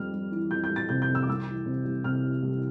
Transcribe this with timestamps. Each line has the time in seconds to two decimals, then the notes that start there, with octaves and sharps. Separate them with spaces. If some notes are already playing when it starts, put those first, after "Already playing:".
Already playing: F2 G3 F6
0.12 G3
0.32 E3
0.51 F2 G6
0.64 G6
0.70 G3
0.76 A6
0.89 C3 G6
1.02 G6
1.08 F2
1.15 E6
1.22 D6
1.28 C2 E6
1.47 E3
1.66 C3
1.85 C2
2.04 C3 F6
2.24 E3
2.43 C2